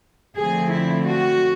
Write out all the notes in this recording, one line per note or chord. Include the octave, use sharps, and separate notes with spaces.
D3 F3 A3 C4 G#4
E4
F#4